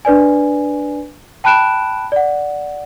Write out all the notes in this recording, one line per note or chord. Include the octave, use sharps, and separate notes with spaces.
D4 B4 D5 G#5
G5 A5 B5 F#6 D7 E7
D5 F#5